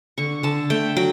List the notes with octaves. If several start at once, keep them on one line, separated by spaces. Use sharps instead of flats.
D3 C#6
D3 A5
A3 G5
F#3 G5